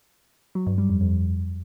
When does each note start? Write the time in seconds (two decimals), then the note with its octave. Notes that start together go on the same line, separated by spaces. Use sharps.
0.55 F#3
0.67 G2
0.78 G3
0.90 F2
1.01 F2